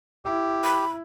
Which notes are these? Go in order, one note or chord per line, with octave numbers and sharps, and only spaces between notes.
E4 G4
B5